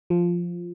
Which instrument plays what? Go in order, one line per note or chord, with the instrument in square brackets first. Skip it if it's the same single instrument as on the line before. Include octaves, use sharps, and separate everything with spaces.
[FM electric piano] F3